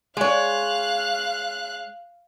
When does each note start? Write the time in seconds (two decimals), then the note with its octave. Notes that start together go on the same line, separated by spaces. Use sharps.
0.17 G#3 C#5 F5 F#6